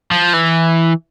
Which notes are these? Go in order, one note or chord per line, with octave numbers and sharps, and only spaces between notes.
F3
E3